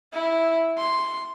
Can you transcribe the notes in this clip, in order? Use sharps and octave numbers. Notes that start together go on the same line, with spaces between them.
E4
C6